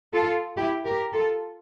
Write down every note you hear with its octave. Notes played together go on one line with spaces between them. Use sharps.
F4 A4
E4 G4
G4 A#4
F4 A4